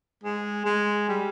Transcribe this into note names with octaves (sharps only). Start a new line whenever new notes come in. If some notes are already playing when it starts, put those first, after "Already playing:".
G#3
G#3
G3